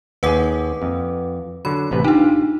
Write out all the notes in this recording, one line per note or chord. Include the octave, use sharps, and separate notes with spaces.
D#2 G#4 B4 F#5 D6
F2
D3 F#3 B5
A1 C3 B4
D4 D#4 F4 G4